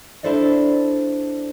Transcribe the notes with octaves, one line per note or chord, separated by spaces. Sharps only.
D4 E4 A4 C5 D5 D#5